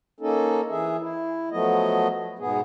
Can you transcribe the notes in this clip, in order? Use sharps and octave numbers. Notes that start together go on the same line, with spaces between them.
A#3 C#4 D#4 A4
E3 G#4 E5
E4
F3 F#3 A3 B3 D#5
G#2 B2 B3 G#4